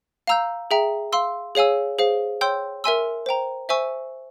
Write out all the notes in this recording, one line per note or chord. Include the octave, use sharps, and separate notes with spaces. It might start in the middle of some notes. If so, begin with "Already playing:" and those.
F5 A#5 E6 G6
G#4 E5 G5 A#5
F5 C6 E6
G#4 C#5 F5 G#5 E6
G#4 C5 F5
C#5 G5 C6 E6 G6
A#4 E5 G#5 C6 E6
C5 G5 A#5
C5 E5 G#5 C#6 E6